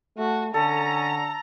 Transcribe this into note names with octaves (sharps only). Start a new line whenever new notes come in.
A3 F#4
D3 C#4 A4 A#5